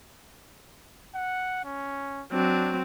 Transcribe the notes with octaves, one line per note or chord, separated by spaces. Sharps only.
F#5
C#4
F#3 C4 D4